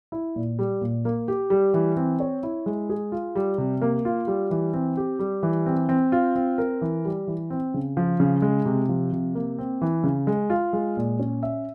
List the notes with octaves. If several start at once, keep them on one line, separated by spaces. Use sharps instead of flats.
E4
A#2
G3
A#2
A#3
G4
G3
E3
C4
C#5
E4
G#3
G#4
F4
G3
C3
A#3
F4
G3
E3
C4
G4
G3
E3
C4
C4
F4
C4
A#4
E3
G3
E3
C4
C#3
F3
C#3
G#3
C3
F3
C3
A#3
C4
E3
C#3
G#3
F4
G#3
A#2
C#4
E5